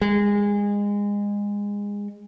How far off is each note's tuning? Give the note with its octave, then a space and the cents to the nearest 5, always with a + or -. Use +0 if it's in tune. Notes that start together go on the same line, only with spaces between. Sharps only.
G#3 -25